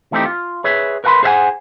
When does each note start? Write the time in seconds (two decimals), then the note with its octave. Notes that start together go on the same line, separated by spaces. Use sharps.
0.12 E3 A3 C4 D#4 G4
0.26 F4
0.64 G#4 B4 C#5 E5
1.04 A#4 B4 F5 A5 B5 C6
1.23 G#4 C5 D5 E5 F#5 G#5